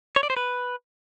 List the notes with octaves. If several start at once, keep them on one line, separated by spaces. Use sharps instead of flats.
C#5
D5
C5
B4